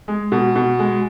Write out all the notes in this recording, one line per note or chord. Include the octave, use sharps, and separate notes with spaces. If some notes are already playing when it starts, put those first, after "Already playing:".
G#3
B2
B2
G#3